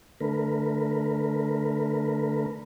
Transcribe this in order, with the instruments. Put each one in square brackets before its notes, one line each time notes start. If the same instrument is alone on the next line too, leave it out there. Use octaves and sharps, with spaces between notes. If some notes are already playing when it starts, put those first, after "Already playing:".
[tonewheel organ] D3 A3 A#4 B4